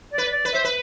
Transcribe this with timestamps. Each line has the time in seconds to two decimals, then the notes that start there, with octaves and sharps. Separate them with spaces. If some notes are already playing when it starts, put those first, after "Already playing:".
0.12 D5
0.18 B4
0.31 D5
0.45 B4
0.52 C5 E5
0.65 B4